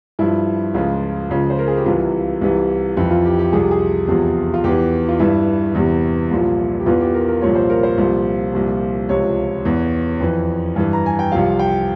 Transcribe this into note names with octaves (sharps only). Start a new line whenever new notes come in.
G2 F3 E4
C#2 C#3 F3 F4
C#2 C#3 F3
C5
A#4
G#4
G4
C2 C3 E3 F4
C2 C3 E3
F2 E3 E4
F4
G4
G4
C2 C3 F3 G#4
G4
G#4
E2 C3 F3
F4
E2 E3 G4
F4
G2 E3 E4
E2 C3 E3
C2 A#2 F3
G4
E2 E3 F4
G4
A#4
A#4
C2 A#2 F3 C#5
C5
A#4
C5
C2 A#2 F3
C2 A#2 F3
C#2 C3 F3 C#5
E2 E3
F2 E3
G2 E3
A#5
G#5
G5
C2 C3 F3 F5
G5